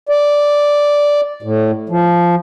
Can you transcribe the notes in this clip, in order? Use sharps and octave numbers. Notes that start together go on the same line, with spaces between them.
D5
A2
F3